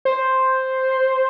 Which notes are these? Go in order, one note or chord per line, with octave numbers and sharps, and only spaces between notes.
C5